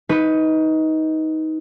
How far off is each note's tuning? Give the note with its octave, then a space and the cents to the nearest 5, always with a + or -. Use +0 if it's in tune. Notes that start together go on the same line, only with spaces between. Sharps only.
D#4 +20 B4 +0